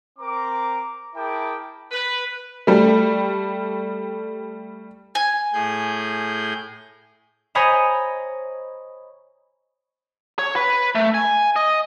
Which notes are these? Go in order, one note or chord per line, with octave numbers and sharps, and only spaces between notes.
C4 A#4 A#5 D6
E4 G#4 A#4 G5 A5 D6
B4
G3 A3
G#5
A2 G#4 G6
C5 C#5 D#5 G#5 A#5 B5
C#5
B4
A3
G#5
D#5